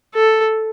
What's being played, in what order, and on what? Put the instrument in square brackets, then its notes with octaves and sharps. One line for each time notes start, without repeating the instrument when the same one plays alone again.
[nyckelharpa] A4